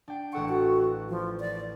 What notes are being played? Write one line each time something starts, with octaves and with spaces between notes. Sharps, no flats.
D4 G5
A1 A4 F#5 C#6
F#4
F3
D5